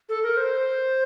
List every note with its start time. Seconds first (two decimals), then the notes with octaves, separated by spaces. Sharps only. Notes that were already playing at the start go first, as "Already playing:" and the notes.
0.09 A4
0.23 A#4
0.37 C5